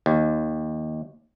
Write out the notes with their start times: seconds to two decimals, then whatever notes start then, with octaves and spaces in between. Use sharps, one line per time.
0.06 D#2